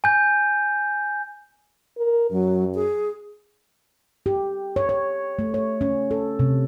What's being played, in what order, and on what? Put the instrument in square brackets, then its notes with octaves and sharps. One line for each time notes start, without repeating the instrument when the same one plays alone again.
[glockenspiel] G#5 G6
[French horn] A#4
[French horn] F#2 [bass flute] F#3
[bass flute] G#4
[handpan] G4
C#5
C#5
A3
C#5
C#4
A4
C3